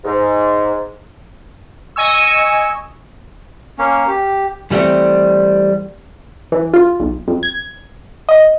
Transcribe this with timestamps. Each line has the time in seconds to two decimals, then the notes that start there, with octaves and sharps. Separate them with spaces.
0.05 G#2
1.96 D#5 G#5 C#6 E6
3.78 A#3 C#4
4.08 G4
4.71 E3 G3 A3 C4
6.52 E3
6.74 F4
7.00 B1
7.28 F2
7.43 G#6
8.29 D#5